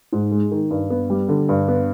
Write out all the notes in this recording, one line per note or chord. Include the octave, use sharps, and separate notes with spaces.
G#2
G#3
D#3
G2
B3
G3
D3
G2
B3